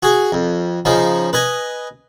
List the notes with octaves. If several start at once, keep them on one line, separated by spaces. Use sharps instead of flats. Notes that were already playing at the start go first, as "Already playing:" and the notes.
F#4 G#4
F2
C#3 F3 D#4
B4 D#5 G#5